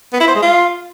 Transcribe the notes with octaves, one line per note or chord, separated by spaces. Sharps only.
B3
E4
C5
G#3
F4